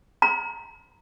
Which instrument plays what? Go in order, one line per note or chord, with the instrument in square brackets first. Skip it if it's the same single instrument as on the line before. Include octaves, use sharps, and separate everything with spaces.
[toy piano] A#5